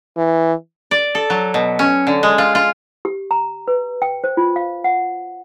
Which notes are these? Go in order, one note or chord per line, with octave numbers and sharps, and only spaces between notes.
E3
D5
A4
F#3
B2
C#4
D3
G#3
F4
F4
G4
A#5
B4
G5
C5
F4
F5
F#5